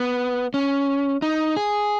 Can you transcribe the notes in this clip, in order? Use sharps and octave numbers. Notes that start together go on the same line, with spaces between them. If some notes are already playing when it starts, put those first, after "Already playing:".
Already playing: B3
C#4
D#4
G#4